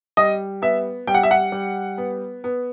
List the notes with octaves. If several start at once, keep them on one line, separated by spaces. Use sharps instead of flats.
G3 D#5
B3 E5
G3 G5
F#5
E5
F#5
G3
B3
B3